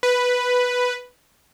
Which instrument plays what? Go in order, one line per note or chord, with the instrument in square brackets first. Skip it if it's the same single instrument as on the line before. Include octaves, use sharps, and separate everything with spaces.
[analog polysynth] B4